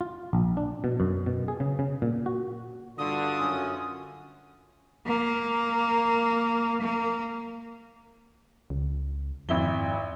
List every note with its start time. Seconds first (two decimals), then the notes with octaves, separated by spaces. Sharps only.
0.01 F4
0.33 A#1
0.57 D4
0.84 B2
1.00 F#2
1.26 B2
1.48 G#4
1.60 C#3
1.79 C#3
2.02 A#2
2.26 F#4
2.98 G2 D3 F4 F#4 D#6
3.39 F#2 C#4
5.06 A#3
6.81 A#3
8.70 C#2
9.49 G#1 F2 E4 G7